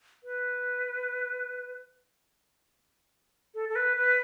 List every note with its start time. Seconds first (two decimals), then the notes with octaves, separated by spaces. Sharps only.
0.24 B4
3.54 A4
3.69 A4
3.76 B4
3.97 B4